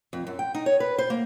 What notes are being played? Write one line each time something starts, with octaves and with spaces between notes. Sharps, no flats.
F2
F#2
G5
D#4
C#5
B4
C5
A#3